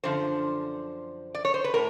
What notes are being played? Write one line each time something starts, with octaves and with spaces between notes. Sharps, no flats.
F#2 D3 F3 C5
D5
C#5
C5
B4
A2 A#4